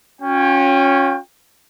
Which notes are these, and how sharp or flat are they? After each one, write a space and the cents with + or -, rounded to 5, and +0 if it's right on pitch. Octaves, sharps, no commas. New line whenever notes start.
C#4 +0 F#4 -45 G5 +30